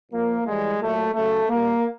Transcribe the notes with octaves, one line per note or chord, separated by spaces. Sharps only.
A#2 F3 A#3
A2 E3 G3 G#3
A#2 F#3 A3
C#3 F#3 A3
A#2 G3 A#3